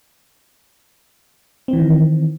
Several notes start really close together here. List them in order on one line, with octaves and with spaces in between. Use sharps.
C4 E3 D#3